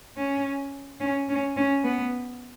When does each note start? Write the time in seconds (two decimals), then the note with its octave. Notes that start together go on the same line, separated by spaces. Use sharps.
0.16 C#4
1.00 C#4
1.29 C#4
1.57 C#4
1.84 B3